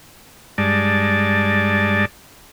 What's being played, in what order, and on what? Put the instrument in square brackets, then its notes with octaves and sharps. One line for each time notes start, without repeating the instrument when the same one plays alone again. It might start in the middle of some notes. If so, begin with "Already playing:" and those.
[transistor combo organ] G2 G#3 D5 A5